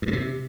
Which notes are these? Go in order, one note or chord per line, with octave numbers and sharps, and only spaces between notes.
G2
A2
C3